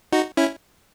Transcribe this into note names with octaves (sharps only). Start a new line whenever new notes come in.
D#4 F#4
C#4 E4